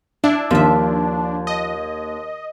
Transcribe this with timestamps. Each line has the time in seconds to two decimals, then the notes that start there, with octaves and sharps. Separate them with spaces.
0.24 D4 E4
0.51 D#2 F3 E5
1.47 D#5